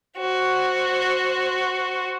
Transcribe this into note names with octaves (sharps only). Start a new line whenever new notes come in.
F#4 C5